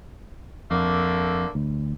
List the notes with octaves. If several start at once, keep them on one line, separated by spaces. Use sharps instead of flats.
F2 D3 A3 A#3
D2